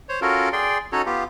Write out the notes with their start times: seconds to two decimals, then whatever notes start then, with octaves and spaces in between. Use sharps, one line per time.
0.09 C5 C#5
0.22 C#4 F4 F#4 A4 A#4
0.53 G#4 D5 G5 C6
0.92 C#4 D#4 F#4 A4 C#5
1.06 B3 F4 G4